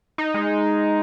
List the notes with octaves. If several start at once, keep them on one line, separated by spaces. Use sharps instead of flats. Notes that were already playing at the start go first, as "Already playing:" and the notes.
D#4
G#3